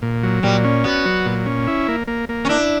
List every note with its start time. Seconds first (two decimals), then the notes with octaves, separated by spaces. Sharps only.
0.02 A#2
0.23 F#3
0.43 A#2 G3
0.64 C#4
0.84 B3 F#4
1.05 F#3
1.26 A#2
1.46 C#4
1.67 E4
1.88 A#3
2.07 A#3
2.29 A#3
2.45 C#4
2.49 D4 E4